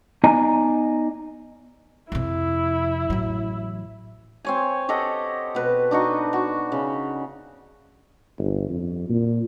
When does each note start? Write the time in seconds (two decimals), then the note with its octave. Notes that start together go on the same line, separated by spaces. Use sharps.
0.24 B3 D#4 D5 D#5 G#5 A#5
2.12 F2 C3 E4
3.10 A1 F#3
4.45 C4 C#5 G#5
4.89 G4 A4 D#5 F#5
5.55 B2 B4
5.91 D4 D#4 F#4 C#6
6.33 F#4
6.72 C#3
8.38 G1
8.69 F2
9.09 A#2